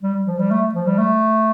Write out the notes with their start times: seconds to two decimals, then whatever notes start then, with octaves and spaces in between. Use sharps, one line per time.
0.03 G3
0.27 F3
0.39 G3
0.51 A3
0.75 F3
0.87 G3
0.98 A3